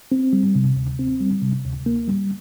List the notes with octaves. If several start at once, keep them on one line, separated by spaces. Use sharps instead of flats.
C4
G3
C3
D2
C4
G3
C3
D2
A#3
G3